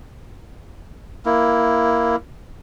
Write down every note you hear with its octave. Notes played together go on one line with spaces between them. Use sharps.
A#3 E4